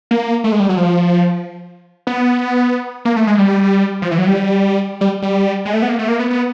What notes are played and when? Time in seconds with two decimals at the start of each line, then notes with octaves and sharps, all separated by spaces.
0.11 A#3
0.44 A3
0.52 G#3
0.60 G3
0.69 F#3
0.77 F3
2.07 B3
3.05 A#3
3.16 A3
3.27 G#3
3.38 G3
4.02 F3
4.11 E3
4.18 F#3
4.27 G3
5.01 G3
5.22 G3
5.65 G#3
5.74 A3
5.82 B3
5.89 A#3
5.99 A3
6.08 A#3
6.19 B3
6.30 B3